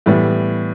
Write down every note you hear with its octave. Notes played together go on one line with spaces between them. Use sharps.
A2 E3 G3 B3